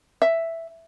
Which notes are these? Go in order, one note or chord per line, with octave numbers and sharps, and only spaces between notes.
E5